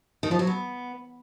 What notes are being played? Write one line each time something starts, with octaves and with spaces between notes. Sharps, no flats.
D#3
F3
F#3
B3